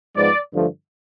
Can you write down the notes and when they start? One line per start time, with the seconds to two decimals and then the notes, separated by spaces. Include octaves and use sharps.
0.16 G#2 F3 G#3 B3 D5
0.53 G2 D3 F3 A3